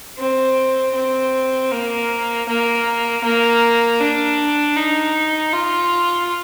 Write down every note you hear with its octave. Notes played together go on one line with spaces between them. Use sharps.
C4
C4
A#3
A#3
A#3
D4
D#4
F4